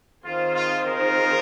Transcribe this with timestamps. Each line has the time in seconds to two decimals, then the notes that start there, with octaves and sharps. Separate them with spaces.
0.25 D#3 C4 F4 G#4 C5
0.54 F4
0.83 F4 A#4